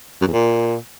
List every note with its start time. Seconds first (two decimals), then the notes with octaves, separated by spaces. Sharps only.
0.21 F#2
0.27 E2
0.33 A#2